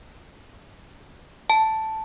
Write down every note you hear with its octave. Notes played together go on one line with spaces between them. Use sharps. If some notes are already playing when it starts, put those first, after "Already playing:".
A5